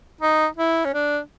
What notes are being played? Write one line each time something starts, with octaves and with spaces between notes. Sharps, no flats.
D#4
E4
C#4
D4